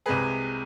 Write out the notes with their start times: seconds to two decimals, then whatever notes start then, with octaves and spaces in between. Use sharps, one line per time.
0.06 C2 C3 G#3 G#4 B4